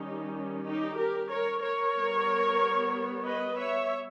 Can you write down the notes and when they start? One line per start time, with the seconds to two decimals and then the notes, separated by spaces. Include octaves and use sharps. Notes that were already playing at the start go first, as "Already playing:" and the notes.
Already playing: D#3 G3 C#4 D#4 G4
0.64 D#4 G4
0.97 G4 A#4
1.29 A#4 C#5
1.62 A#4 C#5
1.95 G3 B3
3.24 B4 D#5
3.56 C#5 E5